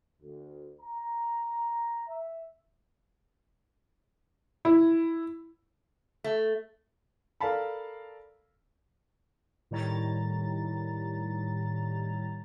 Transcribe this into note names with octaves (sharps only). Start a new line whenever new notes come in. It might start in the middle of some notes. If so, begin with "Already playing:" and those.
D2
A#5
E5
E4
A3
A4 A#4 D5 F5 A5 B5
A2 D#3 G3 C#5 A#5 A6